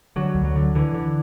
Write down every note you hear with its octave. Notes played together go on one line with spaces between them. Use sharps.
D3 F#3
D2
F#3
D3
D3 E3
D3